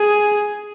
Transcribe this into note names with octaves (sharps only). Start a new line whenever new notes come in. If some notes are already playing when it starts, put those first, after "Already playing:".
Already playing: G#4